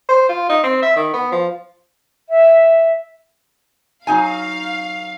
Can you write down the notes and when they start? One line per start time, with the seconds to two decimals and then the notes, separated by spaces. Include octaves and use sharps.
0.09 C5
0.29 F4
0.50 D#4
0.64 C4
0.83 E5
0.96 D#3
1.14 B3
1.32 F3
2.29 E5
4.07 F#3 D#4 F5 G#5